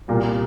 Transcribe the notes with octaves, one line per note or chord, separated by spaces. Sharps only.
C2 A#2 G3 A#3 F4